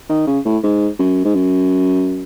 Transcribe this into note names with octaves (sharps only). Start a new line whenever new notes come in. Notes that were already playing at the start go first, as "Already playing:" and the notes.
D#3
C#3
A2
G#2
F#2
G#2
F#2